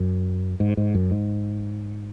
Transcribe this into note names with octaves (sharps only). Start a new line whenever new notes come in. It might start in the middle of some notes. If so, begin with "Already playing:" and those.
Already playing: F#2
G#2
G#2
F#2
G#2